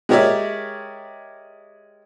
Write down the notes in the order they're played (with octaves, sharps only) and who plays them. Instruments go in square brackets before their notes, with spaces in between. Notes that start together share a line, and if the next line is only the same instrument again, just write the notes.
[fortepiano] G#3 G4 A#4 C#5 D5 E5